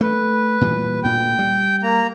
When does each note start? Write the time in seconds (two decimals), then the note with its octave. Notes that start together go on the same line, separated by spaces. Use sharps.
0.01 A3 B4
0.61 A#2 E3 G3
1.04 D2 A#2 G5
1.39 G3
1.83 A#3 A#5